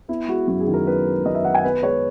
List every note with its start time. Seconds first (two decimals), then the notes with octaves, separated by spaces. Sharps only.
0.09 B3 E4
0.28 G#3 F#4
0.47 F#2 F#4
0.60 G#4
0.67 D#3
0.74 A#4
0.87 B3 B4
1.06 G#3
1.25 F#2 D#5
1.35 E5
1.44 D#3 F#5
1.54 G#5
1.64 B3 B4
1.83 G#3 C#5